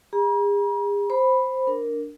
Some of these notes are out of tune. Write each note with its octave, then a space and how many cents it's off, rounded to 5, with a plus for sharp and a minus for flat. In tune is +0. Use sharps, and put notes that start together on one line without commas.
G#4 -40 A#5 +45
C5 +0 B5 +0
D4 -5 A#4 +0